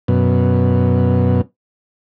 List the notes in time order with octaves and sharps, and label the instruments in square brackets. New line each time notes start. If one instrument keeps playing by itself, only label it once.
[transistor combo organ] F#2 B2